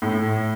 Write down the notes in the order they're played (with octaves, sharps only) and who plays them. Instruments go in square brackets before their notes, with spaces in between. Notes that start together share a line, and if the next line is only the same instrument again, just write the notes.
[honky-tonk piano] A2